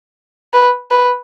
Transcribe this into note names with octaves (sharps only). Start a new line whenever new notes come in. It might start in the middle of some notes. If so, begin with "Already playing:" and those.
B4
B4